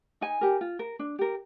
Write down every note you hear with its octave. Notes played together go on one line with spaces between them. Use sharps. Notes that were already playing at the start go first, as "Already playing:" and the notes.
D#4 G#5
G4 A#4
F4
A#4
D4
G4 A#4